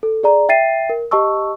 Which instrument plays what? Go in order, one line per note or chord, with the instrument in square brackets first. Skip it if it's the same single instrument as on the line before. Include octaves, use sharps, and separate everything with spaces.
[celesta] A4
G#4 D5 A#5
E5 G5 A6 C7 D#7
A#4
G4 D#5 A5 C#6 E6